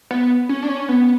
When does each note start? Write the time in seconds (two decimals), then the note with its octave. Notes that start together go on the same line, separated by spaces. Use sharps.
0.11 B3
0.49 C#4
0.63 D4
0.69 C#4
0.89 B3